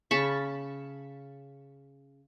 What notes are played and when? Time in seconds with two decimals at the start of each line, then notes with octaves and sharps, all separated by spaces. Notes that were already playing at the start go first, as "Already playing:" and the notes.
0.11 C#3 A5 B5 C#6